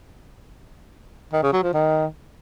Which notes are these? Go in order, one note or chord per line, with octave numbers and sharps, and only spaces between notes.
D#3
C#3
F#3
F3
D#3